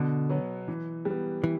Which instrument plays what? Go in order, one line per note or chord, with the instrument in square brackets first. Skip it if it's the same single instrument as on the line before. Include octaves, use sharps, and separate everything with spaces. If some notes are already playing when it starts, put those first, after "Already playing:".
Already playing: [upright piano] B2 [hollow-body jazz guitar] D3
[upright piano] F#3 B3
E3
G3
B3
[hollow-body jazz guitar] E3